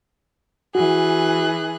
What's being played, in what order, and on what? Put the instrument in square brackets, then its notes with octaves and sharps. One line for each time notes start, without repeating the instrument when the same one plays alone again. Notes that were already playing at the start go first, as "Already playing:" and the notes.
[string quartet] E3 G#4 F#6 [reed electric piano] F#4